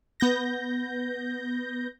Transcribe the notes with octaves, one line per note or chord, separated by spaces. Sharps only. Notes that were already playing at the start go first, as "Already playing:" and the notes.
B3 G6 A#6